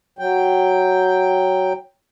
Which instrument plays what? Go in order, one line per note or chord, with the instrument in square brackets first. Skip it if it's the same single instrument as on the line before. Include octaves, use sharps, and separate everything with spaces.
[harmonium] F#3 G5